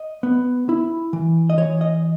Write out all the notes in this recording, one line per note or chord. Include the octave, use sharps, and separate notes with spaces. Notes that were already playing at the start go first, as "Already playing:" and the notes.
Already playing: D#5
B3
E4
E3
D#5
E3 C#5
D#5